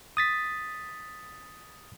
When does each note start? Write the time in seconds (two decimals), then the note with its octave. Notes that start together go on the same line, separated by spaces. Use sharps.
0.17 D#6 A6 B6